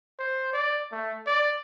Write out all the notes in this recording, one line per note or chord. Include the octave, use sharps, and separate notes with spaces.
C5
D5
A3
D5